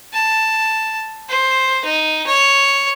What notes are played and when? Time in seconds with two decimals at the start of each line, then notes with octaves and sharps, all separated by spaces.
0.13 A5
1.29 C5
1.85 D#4
2.27 C#5